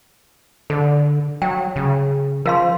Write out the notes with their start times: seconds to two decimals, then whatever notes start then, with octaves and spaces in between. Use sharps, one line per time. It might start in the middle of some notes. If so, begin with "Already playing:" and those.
0.70 D3 A4
1.42 F#3 G5
1.76 C#3
2.46 F3 A#4 F5 C6